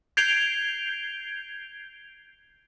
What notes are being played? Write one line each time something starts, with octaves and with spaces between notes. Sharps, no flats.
G6 G#6 C7 D7 F7 G7